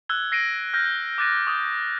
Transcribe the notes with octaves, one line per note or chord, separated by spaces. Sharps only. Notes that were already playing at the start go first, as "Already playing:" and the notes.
E6 F#6 G#6 G7
E6 A#6 C7 D7 D#7
F6 G6 A#6
D6 F#6 A6 A#6 D#7
C#6 D#6 G6